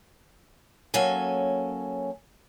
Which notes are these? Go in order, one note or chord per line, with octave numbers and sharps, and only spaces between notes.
F#3 A#3 C#4 A4 G#5